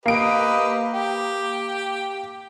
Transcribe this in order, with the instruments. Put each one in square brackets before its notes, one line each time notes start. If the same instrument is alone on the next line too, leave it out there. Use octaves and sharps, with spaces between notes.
[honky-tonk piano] A#3 D7 [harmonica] G4 B4 D#5
[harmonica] G4